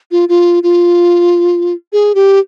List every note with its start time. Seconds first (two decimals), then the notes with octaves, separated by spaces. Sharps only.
0.11 F4
0.29 F4
0.63 F4
1.93 G#4
2.15 G4